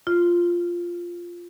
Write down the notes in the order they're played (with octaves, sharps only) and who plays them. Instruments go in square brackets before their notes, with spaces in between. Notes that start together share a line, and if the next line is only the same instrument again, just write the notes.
[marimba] F4